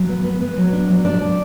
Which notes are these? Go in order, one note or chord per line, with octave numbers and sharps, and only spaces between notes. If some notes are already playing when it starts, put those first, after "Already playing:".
Already playing: F#3
B3
B3
B3
F#3
D4
F#3
D4 D5
D4